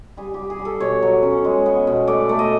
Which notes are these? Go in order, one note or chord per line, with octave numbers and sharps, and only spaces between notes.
G3 G#4
G3 G4
G#4
G3
A4
B2 C#5
F#3
C#4
G#3
B3
B2
A3 D5
A3
D#5